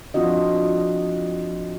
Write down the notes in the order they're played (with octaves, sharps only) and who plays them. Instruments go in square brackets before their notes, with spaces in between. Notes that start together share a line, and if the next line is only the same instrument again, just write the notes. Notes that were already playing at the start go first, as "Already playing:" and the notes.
[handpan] F3 C4 D4 F4 F#4 D#5